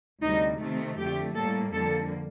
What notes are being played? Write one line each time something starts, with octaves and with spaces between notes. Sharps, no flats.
D2 C3 G3 D#4
C3 D#3 A3 C4
F2 D3 A3 G4
A2 G3 A#3 A4
F2 D3 G3 A#3 A4